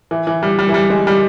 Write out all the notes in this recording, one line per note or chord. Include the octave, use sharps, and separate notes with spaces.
E3
E3
G3
G3
E3
G3
G#3
G3